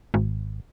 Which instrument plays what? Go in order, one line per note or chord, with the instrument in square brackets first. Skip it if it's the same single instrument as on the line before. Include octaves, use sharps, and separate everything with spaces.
[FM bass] G#1